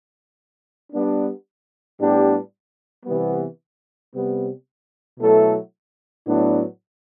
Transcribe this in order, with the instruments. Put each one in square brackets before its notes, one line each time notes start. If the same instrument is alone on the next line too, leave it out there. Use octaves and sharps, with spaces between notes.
[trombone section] G3 B3 D4
A2 G3 B3 D4 G4
C3 E3 G3 B3
C3 G3 B3
B2 F#3 A3 E4 A4
A2 F#3 B3 D4